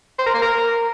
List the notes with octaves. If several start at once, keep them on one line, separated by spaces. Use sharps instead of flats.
C5
A#4
A#3
A#4